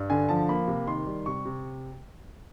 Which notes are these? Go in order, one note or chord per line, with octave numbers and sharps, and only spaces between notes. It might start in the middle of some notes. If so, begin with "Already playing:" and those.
Already playing: G2
D3 G#5
F3 A5
A#3 B5
C3
D#3 C6
G3
C3 C#6
C3